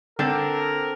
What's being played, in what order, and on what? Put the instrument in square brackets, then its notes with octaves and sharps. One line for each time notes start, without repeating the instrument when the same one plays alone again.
[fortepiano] D3 [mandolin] C4 D4 A4 [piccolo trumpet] A#4